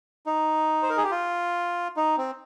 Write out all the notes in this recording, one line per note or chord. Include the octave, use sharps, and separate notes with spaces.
D#4
C5
A#4
G#4
G4
F4
D#4
C4